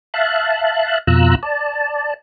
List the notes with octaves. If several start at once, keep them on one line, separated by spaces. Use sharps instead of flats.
E5 F5 A5 F#6
F2 B2 F4 A#5 E6 F#6
D5 A5